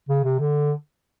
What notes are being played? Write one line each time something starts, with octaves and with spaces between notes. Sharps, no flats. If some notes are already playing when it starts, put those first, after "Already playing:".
C#3
C3
D3